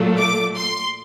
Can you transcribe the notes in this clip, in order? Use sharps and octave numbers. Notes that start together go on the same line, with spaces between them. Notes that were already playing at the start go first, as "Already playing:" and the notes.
Already playing: A#2 F#3 A3
D6
C6